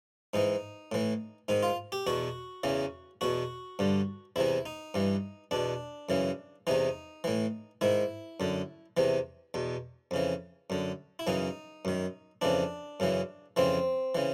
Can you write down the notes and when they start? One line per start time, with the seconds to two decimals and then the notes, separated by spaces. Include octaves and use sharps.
0.34 G#2 E3 D#4
0.92 A2 E3
1.48 G#2 D#3 D#4
1.63 F4
1.92 G4
2.07 E2 B2 F#4
2.63 E2 C#3 E3
3.21 E2 B2 F#4
3.79 G2 D3
4.36 E2 C3 E3 E4
4.66 D#4
4.94 G2 E3
5.51 E2 B2 D4
6.09 F#2 C#3 E3
6.67 E2 C3 E3 D#4
7.24 A2 E3
7.81 G#2 D#3 E4
8.40 F#2 D3
8.97 E2 C3 E3
9.54 E2 B2
10.11 F2 C#3 E3
10.70 F#2 D3
11.19 E4
11.27 F#2 C#3 E3 D#4
11.85 F#2 D#3
12.41 F2 C#3 E3 D4
13.00 F#2 C#3 E3
13.56 F2 C#3 E3 C4
14.15 C#3 E3